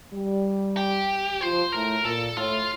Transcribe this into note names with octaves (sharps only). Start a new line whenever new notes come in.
G3
G4
F3 C5
A2 A#4
A#2 A4
A2 F4